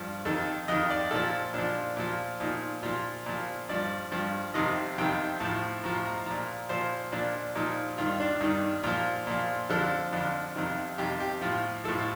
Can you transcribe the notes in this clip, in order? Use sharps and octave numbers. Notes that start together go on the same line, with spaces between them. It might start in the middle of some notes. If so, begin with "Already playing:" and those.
Already playing: G2 F3
F2 D#3 A4
F2 D#3 D#5
D5
A#2 F3 A4
A#2 F3 D4
A#2 F3
A#2 F3 D#4
A#2 F3 F4
A#2 F3
G2 F3 D5
G2 F3
F2 C3 D#3 D#5
F2 C3 D#3 G5
A2 F3 A5
A2 F3 A#5
A#5
A#2 F3 A#5
A#2 F3 C5
A#2 F3 D4
A#2 F3 D#4
G2 D#3 F4
D4
G2 D#3 D#4
A#2 F3 F4
A#2 F3
F2 D3 F3 A4
F2 D3 F3
F2 C3 D#3
F2 C3 D#3 G4
G4
A2 F3 F4
A2 F3 A4